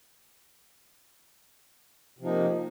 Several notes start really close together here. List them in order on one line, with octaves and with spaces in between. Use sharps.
C3 F3 D#4 A#3